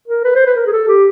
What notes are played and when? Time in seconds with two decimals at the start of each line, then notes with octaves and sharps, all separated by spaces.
0.08 A#4
0.24 B4
0.35 C5
0.46 B4
0.56 A#4
0.67 G#4
0.73 A4
0.88 G4